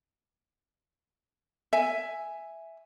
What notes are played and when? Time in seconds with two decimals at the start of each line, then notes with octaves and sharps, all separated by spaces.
1.73 E5 G#5